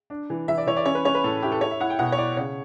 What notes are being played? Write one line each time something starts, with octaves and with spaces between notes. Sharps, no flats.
D4
E3
E3 E5
D5
E3 C#5
D5
C#4 C#5
B4
C#4 C#5
B4
A2 A4
E4 G4
A4
E4 C#5
E5
E4 F#5
G5
B2 F#5
C#5
E4 D5
C#3 C#5